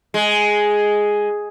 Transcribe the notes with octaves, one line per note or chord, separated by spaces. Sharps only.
G#3